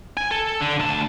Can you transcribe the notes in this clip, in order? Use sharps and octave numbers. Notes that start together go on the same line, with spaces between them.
G#5
A4
D3
D2 A5